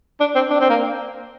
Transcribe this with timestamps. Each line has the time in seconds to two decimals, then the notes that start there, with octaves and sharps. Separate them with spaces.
0.20 D4
0.35 C4
0.50 D4
0.60 C4
0.69 A#3